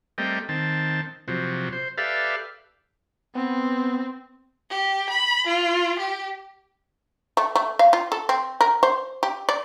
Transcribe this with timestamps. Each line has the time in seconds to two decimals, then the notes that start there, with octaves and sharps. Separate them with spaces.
0.18 G3 A3 A#3 C4 D#5 G5
0.49 D#3 C4 A5
1.28 C3 F3 F#3
1.73 C5
1.98 G4 A4 B4 D5 E5 F5
3.35 B3 C4
4.70 G4
5.10 B5
5.47 F4
5.99 G4
7.37 A3
7.55 A3
7.79 F5
7.93 F4
8.12 A4
8.29 C4
8.61 A#4
8.83 C5
9.23 G4
9.49 D5